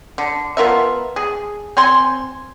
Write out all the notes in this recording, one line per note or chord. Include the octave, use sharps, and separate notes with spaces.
D3
B3 F4 A#4 E5
G#4
C4 G#5 C6